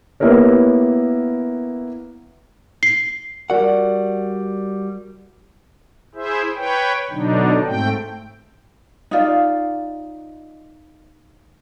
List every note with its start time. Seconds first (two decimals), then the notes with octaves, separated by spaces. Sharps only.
0.20 A#3 B3 E4 G4 A#4 C#5
2.83 C7
3.50 G3 F#4 A#4 D5 F#5
6.15 E4 G#4 C5 E5
6.56 B4 C#5 G5
7.11 B2 D3 F#3 D4 D#4
7.66 G#2 A3 C4 G5
9.11 D#4 F4 D5